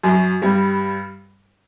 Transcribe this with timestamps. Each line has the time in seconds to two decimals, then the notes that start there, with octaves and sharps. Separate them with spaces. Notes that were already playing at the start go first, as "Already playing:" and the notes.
0.04 F#2 F#3
0.42 G2 G3